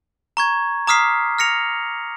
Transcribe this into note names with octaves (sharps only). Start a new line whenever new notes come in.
A#5 C#6 G#6
A#5 D6 D#6 F6 B6 C7
F6 A#6 C#7 F7